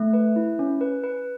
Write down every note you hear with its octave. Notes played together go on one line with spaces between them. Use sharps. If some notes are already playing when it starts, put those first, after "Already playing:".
Already playing: A3
B4
E4
C#4
B4
B4